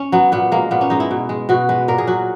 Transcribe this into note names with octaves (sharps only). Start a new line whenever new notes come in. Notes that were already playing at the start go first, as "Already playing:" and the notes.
Already playing: C#4
F#3 B3
A#2 B3
G#3 A#3
A#2 B3
C#4
G#3 D#4
E4
B2
G#3
B2 F#4
G#3 B4
A#2 A#4
G#4
F#3 F#4